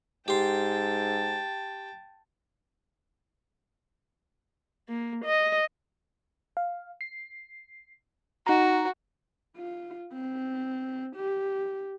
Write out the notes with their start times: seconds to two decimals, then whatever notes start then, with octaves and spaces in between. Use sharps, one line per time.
0.28 G#2 G4 G5 A5 C6
4.88 A#3
5.25 D#5
6.57 F5
7.01 C7
8.47 D#4 F#4 A#5
9.57 F4
10.13 C4
11.16 G4